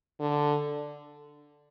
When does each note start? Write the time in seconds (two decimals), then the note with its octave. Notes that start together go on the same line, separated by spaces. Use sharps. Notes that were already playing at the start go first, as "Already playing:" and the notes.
0.20 D3